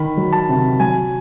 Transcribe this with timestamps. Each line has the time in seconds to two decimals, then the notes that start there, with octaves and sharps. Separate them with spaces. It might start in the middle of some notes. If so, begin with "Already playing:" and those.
Already playing: D#3 B5
0.17 F#3
0.33 A5
0.49 C3
0.80 F#3 G#5